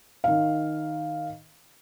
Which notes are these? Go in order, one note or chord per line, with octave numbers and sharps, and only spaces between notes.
D#3 F5